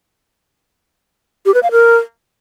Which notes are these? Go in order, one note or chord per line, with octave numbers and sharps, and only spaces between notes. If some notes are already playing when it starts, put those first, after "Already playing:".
G4
B4
F5
A#4